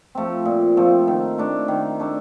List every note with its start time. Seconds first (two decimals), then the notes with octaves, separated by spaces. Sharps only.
0.15 F3 A3 C4
0.45 A#2
0.77 F3 A3 C4
1.08 D#3
1.38 A3 D4
1.68 D#3
2.00 A3 D4